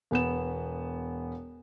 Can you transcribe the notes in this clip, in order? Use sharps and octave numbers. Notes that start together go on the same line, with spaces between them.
E1 B3 E7